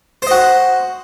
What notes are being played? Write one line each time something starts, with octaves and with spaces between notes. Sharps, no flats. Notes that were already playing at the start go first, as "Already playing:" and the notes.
F#4 C5 D#5